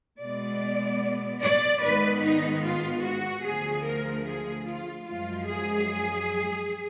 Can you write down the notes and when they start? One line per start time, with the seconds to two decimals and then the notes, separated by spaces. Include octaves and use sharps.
0.20 B2 G#3 B3 D5
1.42 D5
1.82 G#2 D#3 G#3 B3 B4
2.22 D#4
2.63 F4
3.03 F#4
3.44 D2 D3 F3 G#4
3.85 A#4
4.26 G#4
4.66 F4
5.06 F#2 F3 G#3 F4
5.47 G#4